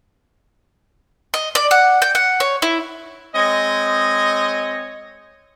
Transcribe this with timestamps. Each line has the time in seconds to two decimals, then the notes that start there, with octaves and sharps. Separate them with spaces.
1.34 D#5
1.55 D5
1.71 F#5
2.02 G5
2.15 F#5
2.40 C#5
2.62 E4
3.34 G#3 C4 C#5 D#5